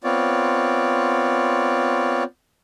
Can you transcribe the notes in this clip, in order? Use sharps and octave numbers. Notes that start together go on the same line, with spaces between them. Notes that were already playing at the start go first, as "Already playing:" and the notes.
B3 C4 F4 C#5 D5